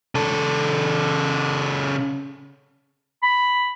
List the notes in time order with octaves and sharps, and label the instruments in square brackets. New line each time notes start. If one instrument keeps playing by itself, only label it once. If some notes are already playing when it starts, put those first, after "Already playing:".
[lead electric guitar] C#3 A4
[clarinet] B5